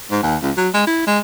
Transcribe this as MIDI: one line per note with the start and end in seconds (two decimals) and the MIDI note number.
0.11 0.22 44
0.23 0.36 39
0.42 0.51 37
0.57 0.69 54
0.74 0.84 56
0.87 1.05 64
1.07 1.19 56